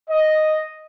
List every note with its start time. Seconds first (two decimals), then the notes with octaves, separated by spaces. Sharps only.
0.10 D#5